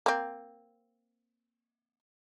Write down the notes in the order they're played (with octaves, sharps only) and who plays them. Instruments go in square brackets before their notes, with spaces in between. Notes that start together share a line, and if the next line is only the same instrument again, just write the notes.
[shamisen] A#3 C4